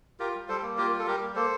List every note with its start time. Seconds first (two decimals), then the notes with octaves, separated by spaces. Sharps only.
0.20 F4 G4 A#4
0.35 G3
0.48 G3 A4 C5
0.63 A#3
0.78 F4 G4 A#4
0.93 G3
0.99 A4
1.07 G3 G4 A#4
1.21 A#3
1.35 A#3 A4 C5